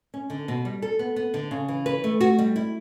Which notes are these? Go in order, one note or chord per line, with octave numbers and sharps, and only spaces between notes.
C#4
D3
B2
G3
A4
B3
B3
D3
C#3
E3
B4
A3
F#4
G3
E4